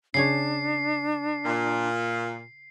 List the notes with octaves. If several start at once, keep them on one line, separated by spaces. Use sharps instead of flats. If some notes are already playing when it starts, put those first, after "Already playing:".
C#3 D4 G#4 C#5 C7
A#2